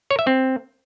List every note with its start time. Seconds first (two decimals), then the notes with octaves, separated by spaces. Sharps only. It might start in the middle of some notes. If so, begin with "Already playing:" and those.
0.11 C#5
0.19 E5
0.27 C4